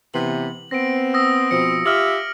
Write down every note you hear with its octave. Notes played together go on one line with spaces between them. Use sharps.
C3 E3 B3 F#7
B3 C4 A#6 D7
D#6 E6 A#6
B2 F3 C4 D#6 C#7
F4 G4 E5 F6 F#7